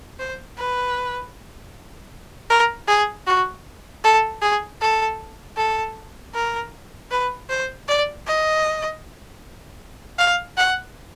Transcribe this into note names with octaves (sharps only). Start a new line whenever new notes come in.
C5
B4
A#4
G#4
F#4
A4
G#4
A4
A4
A#4
B4
C5
D5
D#5
F5
F#5